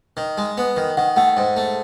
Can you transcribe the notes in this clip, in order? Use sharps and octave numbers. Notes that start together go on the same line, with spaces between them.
D#3
G#3
B3
D#3
D#3 F#5
A3 F#5
G#2
A3